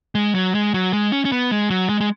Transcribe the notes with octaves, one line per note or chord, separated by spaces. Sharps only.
G#3
F#3
G#3
F#3
G#3
C#4
C#4
B3
G#3
F#3
G#3
G#3